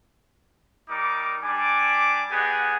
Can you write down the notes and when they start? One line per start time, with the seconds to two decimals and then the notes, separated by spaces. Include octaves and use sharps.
0.89 G3 D#4 A#4 D6
1.42 G3 D4 G#5 D6
2.30 B3 G4 G#4 D#5 F#5 G#5